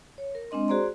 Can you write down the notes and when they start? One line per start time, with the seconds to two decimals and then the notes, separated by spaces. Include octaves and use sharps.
0.18 C#5
0.35 A#4
0.51 G#3 C4 D4 D#5 C6
0.68 F#4 G#4 C5 D5 A#5 C6